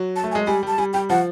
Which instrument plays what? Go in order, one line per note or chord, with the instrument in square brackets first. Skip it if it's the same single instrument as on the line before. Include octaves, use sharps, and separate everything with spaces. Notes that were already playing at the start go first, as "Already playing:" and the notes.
Already playing: [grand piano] F#3
[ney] A5
[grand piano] A3
[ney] G#5
[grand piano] G#3
[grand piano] G3 [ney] G#5
[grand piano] G3 [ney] A5
[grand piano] G3 [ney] G#5
[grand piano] G3 [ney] G5
[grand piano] F3 [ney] F#5